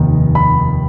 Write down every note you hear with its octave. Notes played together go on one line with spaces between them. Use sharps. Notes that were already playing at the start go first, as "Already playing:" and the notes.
Already playing: F1 D#2 D#3
B5